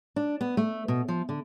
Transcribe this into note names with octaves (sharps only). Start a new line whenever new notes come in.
D4
B3
A3
B2
F3
D3